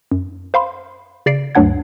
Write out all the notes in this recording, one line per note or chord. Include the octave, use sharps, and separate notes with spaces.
F#2
C5 F5 B5 C6
C#3 D5 C7 D7
D2 G2 F#3 D4 F#5 G#6